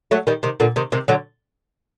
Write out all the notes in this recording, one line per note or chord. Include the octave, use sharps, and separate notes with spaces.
F#3 A3
D#3 G3
C3 D#3
A#2 D3
C3 D#3
C3 D#3
D3 F#3